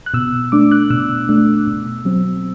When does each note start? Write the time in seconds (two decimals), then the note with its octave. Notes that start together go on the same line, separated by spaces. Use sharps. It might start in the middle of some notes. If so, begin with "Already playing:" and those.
0.06 F#6
0.14 B2 E6
0.52 A3 D4 D6
0.71 F#6
0.90 B2 E6
1.29 A3 D4
1.67 B2
2.05 F#3 C4